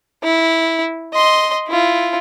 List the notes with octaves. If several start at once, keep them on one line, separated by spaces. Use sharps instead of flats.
E4
D#5 C6
E4 F4